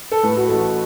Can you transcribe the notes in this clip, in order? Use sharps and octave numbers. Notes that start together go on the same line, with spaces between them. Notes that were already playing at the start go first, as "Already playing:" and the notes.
A4
A2 B4
F#4
A1 A4